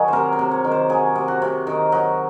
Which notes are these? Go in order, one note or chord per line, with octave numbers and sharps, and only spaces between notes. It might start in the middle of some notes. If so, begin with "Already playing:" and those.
Already playing: D#3 F#3 G#4
C3 A#4 C5
C5
C3
C#5
D#3
C5
F#3 G#4
C3
F#4
C3
D#3 D#4
F#3 D#4